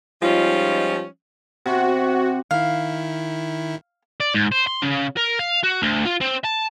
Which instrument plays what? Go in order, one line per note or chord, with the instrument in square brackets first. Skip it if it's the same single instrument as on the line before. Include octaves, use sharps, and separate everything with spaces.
[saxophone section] F3 G3 G#3 C#4 D#4 F4
[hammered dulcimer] C3 [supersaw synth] F#4
[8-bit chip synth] D#3 E4 [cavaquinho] F5
[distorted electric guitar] D5
G#2
C5
C6
C#3
A#4
F5
F#4
D2
F4
C4
A5